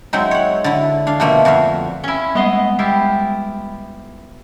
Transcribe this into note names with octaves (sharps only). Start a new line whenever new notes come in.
F#3 G#3 C4 D#4 E5
C#5 F#5
D3 E4
D4 F5
B2 F3 A3 A#3 E5
F2 F#4 E5 F5
C#4 E4
G3 G#3 B3 D#5 C6
E4 F4 G4